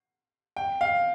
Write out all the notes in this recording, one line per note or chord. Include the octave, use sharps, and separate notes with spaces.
G5
F5